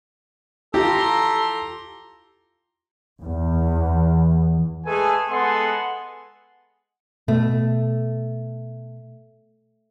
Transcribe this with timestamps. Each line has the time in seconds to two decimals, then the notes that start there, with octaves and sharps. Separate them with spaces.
0.74 E4 F4 G4 A4 A#5 C6
3.23 E2
4.86 G#3 A3 G#4 A4 B4 G#5
5.29 G#3 B3 A4 F#5 G#5 C6
7.28 B2 A3